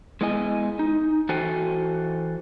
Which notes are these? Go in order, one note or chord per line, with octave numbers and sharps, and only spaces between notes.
G#3 B3 E4 D#5 G#5
D#4
E3 F#4 A4 C5 G5 G#5